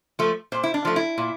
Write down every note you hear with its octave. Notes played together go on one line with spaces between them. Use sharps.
F3 A3
A#2 C5
E4
D4
F3 A3
E4
A#2